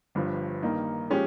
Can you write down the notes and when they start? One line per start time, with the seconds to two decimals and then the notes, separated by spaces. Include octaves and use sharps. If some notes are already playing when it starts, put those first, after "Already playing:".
0.15 G1 G2 F3
0.63 G2 D#3 A#3 D#4
1.10 F3 G#3 C#4 G4